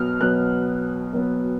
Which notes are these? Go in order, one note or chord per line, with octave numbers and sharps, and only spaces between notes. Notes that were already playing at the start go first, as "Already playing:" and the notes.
Already playing: B2 F#3 B3 F6
B2 F#3 B3 F#6
B2 F#3 B3